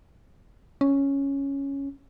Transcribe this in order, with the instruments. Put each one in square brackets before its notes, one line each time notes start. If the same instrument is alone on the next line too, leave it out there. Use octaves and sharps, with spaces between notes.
[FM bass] C#4